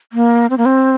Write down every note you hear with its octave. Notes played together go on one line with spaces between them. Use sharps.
A#3
C4
A#3
C4